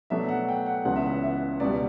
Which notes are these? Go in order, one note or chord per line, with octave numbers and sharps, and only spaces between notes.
B2 F#3 A3 D4 E5
F#5
G5
F#5
C#2 C#3 E3 B3 D4 F#5
E5
F#5
E5
C#2 B2 G3 D5